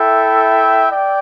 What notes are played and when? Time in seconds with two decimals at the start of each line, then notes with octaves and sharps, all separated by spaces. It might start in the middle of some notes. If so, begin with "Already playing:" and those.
Already playing: E4 A4 E5 G5
0.91 D5 G5